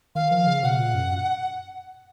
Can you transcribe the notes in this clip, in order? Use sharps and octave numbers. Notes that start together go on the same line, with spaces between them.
D#3 F5
F3
C#3
B2 F#5
A#2
F#2